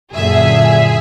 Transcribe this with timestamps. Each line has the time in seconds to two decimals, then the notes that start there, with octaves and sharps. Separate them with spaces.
0.12 F#2 A#2 D3 G#4 E5